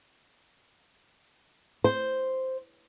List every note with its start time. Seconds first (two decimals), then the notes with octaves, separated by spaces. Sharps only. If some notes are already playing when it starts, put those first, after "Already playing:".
1.84 C5